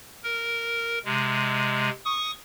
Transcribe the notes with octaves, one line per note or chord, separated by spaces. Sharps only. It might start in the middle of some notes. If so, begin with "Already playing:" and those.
A#4
C3 G#3
C#6 D#6